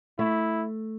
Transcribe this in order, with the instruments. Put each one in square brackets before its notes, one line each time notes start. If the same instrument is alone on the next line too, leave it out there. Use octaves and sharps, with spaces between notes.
[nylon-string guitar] A3 [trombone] E4